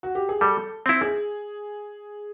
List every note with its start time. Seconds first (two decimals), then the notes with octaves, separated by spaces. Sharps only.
0.03 F#4
0.15 G4
0.29 G#4
0.41 G3 A4
0.86 C4 E4
1.01 G#4